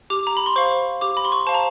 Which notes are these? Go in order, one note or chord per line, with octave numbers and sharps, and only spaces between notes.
G4 D6
A#5
B5
C6
C5 F5 C#6
G4 D6
B5
C6
C#6
C5 F5 A5
A#5